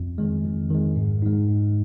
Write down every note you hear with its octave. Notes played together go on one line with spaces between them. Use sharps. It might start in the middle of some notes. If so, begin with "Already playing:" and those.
Already playing: F2
D#3 G#3
F2
D#3 G#3
G#2
G#3 D#4
G#2